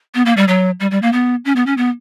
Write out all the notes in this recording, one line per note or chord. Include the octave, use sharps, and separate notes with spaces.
B3
A#3
G3
F#3
G3
G3
A#3
B3
C#4
B3
C#4
B3